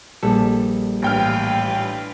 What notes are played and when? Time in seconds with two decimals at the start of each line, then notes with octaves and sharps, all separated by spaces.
0.23 A#1 G3 A4
1.02 A1 D4 F4 B4 G5 F6